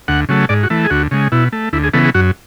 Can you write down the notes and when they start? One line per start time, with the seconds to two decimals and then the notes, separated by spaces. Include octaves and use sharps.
0.08 D2 F#5
0.29 C#3 F#3 A3
0.49 G#2 D5
0.63 F#4
0.70 E3 A3
0.84 G#4
0.90 D2 F#4
1.11 C#3 G#3
1.32 B2 E4
1.52 A3
1.73 D2 E4
1.84 G#4
1.94 C#3 E3 B3 A4
2.05 G#4
2.15 F#2 F#4